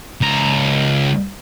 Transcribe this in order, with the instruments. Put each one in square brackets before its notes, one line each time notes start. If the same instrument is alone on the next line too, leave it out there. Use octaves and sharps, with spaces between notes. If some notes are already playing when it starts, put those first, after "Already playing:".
[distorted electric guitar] C#2 A#5